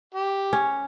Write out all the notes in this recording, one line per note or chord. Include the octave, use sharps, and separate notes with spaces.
G4
C#4